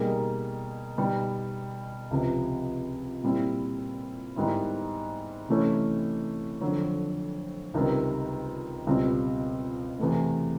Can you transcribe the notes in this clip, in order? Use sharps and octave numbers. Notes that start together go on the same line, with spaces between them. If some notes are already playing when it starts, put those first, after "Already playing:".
Already playing: B2 G3 A#3 D#4 G#4
B2 G3 B3 D#4
C#2 C3 F3
A#2 G3 C4 E4
G#2 D#3 G3 B3 E4
C3 E3 A3 C#4
F2 D3 F#3
C#2 C3 D#3 G3 C4
C#2 B2 G3 C4 F4
E2 C3 E3 A3